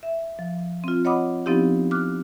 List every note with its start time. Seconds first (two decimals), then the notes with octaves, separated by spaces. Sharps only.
0.03 E5
0.39 F3
0.84 C4 F4
1.05 C#5 D#5 F#5 B5 D6 D#6
1.46 F3 B3 C4 D#4 E4 G4
1.91 D6 F6 F#6